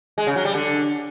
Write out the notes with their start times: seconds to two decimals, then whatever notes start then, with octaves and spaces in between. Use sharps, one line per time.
0.18 G#3
0.27 C#3
0.36 F#3
0.45 G3
0.54 D3